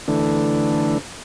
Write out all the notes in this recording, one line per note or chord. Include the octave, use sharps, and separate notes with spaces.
D3 E3 A3 D4